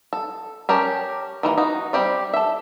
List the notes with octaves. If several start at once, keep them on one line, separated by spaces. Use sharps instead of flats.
A4
C#4 G4 A#4 A5
D#3 E3 A3 A#3
D#4 F#4
G3 C4 G4 D5
A4 E5